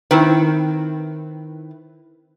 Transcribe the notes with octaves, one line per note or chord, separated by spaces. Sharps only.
D#3 C4 E4 B4